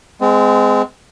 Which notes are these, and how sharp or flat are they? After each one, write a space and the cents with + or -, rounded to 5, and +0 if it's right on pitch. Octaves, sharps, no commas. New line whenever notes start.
G#3 +0 C4 -35